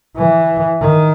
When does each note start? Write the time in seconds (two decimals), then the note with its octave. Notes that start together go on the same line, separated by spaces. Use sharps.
0.16 E3
0.81 D#3